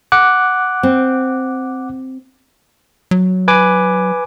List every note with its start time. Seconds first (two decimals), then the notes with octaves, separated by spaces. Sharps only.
0.12 F#5 D6 F#6
0.83 C4
3.11 F#3
3.48 B4 G#5 D6